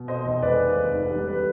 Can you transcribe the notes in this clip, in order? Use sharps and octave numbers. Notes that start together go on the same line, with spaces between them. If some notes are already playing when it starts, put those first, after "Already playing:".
Already playing: B2
C4 C5 D#5
F1 C5 D#5
G#3 B4 D5
D#2
F1
G#2
G3
G3 B4